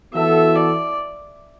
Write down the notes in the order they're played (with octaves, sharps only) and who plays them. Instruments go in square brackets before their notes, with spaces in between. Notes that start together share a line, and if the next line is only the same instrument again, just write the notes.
[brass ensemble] E3 B3 F#4 A4 [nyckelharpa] E5
[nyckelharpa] D5